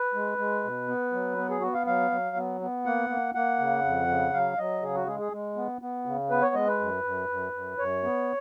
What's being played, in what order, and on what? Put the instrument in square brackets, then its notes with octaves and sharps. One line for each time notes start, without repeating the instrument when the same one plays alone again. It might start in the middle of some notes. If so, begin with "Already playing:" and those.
Already playing: [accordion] B4
G#3
G#3
B2
B3
F#3
B3
G#4
B3 F#4
F5
F#3 F5
F#3
B3
B3
A#3 F#5
A#3
A#3 F#5
C#3
F2
C#3
F#3 F5
F#3 D#5
C#3 G#4
F#4
G#3 G#4
G#4
G#3
B3
B3
C#3
B3 B4
C#5
G#3 D#5
B4
F#2
F#2
F#2
F#2
F#2 C#5
B3